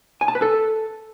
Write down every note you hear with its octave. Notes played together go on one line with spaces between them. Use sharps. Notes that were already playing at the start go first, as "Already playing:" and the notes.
G#5
A5
B4
A4